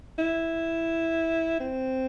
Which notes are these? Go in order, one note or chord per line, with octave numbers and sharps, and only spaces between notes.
E4
C4